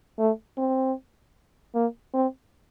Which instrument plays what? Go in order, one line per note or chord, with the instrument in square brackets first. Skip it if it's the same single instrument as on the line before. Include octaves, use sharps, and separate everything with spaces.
[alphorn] A3
C4
A#3
C4